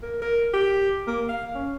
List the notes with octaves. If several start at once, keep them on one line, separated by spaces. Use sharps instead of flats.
A#4
A#4
G4
A#3
F5
C#4